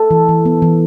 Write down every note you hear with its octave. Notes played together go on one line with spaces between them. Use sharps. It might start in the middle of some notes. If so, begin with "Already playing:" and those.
Already playing: A4
E3
E3
B3
E3